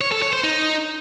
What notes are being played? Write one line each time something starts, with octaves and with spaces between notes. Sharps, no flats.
C#5
A4
C#5
C5
D#4